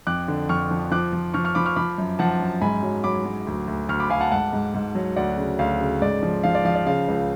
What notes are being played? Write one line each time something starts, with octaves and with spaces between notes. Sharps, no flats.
F2 D6 F#6
D3
F2 C#6 F6
F3
F3 D6 F#6
F3
F3 C#6 F6
C#6 F6
F3 B5 D6
C#6 F6
F3 B5 D6
F#2
F3 F#5 A5
F#2
G#2 G#5 B5
F#3
F#3 B5 D6
F#3
D2
D2
D2 C#6 F6
B5 D6
D2 F5 G#5
F#5 A5
G#2 F#5 A5
G#2
G#2
F#3
D2 D5 F#5
C#3
D2 F5
C#3
G#2 D5
F3
F3 F5
D5
F3 F5
D5
C#3 F5
C#2